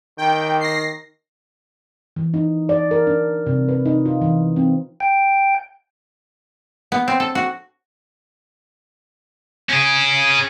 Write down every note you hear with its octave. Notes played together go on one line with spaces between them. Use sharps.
D#3 G5
A#6 C7
E3
D#4
D5
A#4
D4
C3
B4
D#4
F4
E3
C4
G5
B3
C4
A4
F#4
C#4 G#4